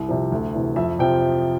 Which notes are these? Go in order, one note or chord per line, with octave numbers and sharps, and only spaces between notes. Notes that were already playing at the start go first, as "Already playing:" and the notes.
Already playing: C2
C3 F3
D2
C3 E3
F2 E5
C3 F3 G5